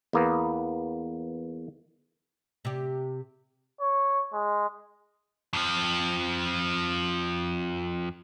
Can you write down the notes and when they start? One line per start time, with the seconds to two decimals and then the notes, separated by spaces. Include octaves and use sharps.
0.13 E2 A#3 B3
2.65 C3 G4
3.81 C#5
4.33 G#3
5.53 F2 F3